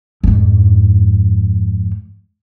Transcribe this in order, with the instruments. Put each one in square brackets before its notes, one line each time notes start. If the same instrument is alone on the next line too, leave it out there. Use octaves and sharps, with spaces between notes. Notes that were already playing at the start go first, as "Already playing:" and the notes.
[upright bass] F2 G#2